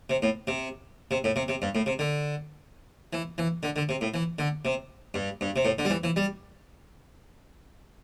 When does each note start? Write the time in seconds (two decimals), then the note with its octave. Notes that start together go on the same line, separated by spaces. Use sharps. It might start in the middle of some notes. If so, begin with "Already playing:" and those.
0.10 C3
0.22 A2
0.47 C3
1.11 C3
1.24 A2
1.36 C3
1.48 C3
1.62 G2
1.75 A2
1.86 C3
1.99 D3
3.13 E3
3.38 E3
3.63 D3
3.76 D3
3.89 C3
4.01 A2
4.14 E3
4.39 D3
4.65 C3
5.14 G2
5.41 G2
5.56 C3
5.65 A2
5.79 D3
5.85 G3
5.90 E3
6.04 E3
6.16 G3